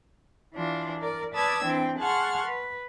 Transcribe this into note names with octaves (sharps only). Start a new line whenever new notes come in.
E3 D4 F4
A#4 D5
B4 D5 A5 D#6 E6 G#6
E3 C4 D4 G5
G#4 F#5 A5 C6 C#6 F6
B4